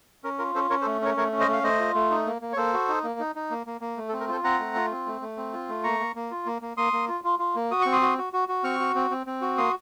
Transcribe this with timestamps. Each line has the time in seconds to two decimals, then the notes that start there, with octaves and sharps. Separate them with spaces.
0.24 C#4 A#4
0.39 F4 A#4
0.55 C#4 A4 C5
0.70 C#4 A#4 C#5
0.81 A4 C5
0.86 A3
1.01 C#4 A#4 C#5
1.17 A3 A#4 C#5
1.32 C#4
1.40 C5 D#5
1.48 A3 F5
1.63 A3 C5 D#5
1.79 F4
1.95 A3
2.10 D#4
2.26 A#3
2.42 A#3
2.53 C#5
2.57 A#3 A4 C5
2.73 F#4
2.88 D#4
3.04 A#3
3.20 D#4
3.35 D#4
3.50 A#3
3.67 A#3
3.81 A#3
3.97 A3
4.09 A4
4.13 C4
4.20 A#4
4.28 F4 A4 C5
4.44 C4 F#5 A#5
4.59 A3
4.75 F4
4.91 C4
5.06 A3
5.21 A3
5.37 C4
5.53 F4
5.69 A3
5.84 A#3 A#5 C#6
6.00 A#3
6.15 A#3
6.31 F4
6.46 A#3
6.62 A#3
6.77 A#3 C6 D#6
6.93 A#3
7.08 F4
7.24 F4
7.39 F4
7.56 A#3
7.71 F#4 D#6
7.82 C4 C#6
7.92 C6 D#6
8.01 F#4
8.18 F#4
8.33 F#4
8.48 F#4
8.64 C4 C#6 F6
8.80 F#4
8.95 C4
9.11 C4
9.27 C4
9.41 F#4
9.58 A#3 C6 D#6